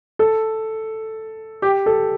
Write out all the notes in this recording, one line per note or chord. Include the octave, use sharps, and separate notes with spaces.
A4
G4
A4